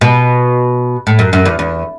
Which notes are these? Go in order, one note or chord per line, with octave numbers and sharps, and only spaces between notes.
B2
A2
F#2
F#2
E2
E2